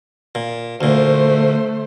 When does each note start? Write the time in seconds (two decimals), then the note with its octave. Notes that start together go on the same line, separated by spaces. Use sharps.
0.35 A#2
0.81 D2 A#2 A3 C5